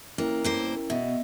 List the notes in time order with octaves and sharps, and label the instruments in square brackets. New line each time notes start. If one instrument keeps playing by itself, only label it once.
[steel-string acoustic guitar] A#3 [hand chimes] C#4 E4 A#4
[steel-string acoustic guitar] G2 A#3 C5
[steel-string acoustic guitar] B2 [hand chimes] D#5 E5